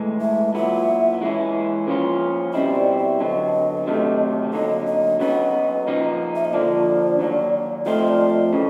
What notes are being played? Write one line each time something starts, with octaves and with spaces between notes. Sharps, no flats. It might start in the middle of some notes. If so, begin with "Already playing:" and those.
Already playing: A2 E3 G#3
E5
A#2 F#3 B3 E4 E5
E3 G#3 C#4 E4
C#3 F3 A#3 C#4 F4
B2 G3 C4 E4 D#5
D5
E5
D3 F#3 B3 D#5
C3 D#3 F#3 A3
D3 F#3 A#3 D#4 D#5
D#5
C#3 F#3 B3 D#4 D#5
A#2 F3 A#3 D#4
E5
D#5
D3 F3 A#3 D4 D5
D#3 F#3 A#3
F3 A3 C4 F4 D#5
D5
D#5
C#3 E3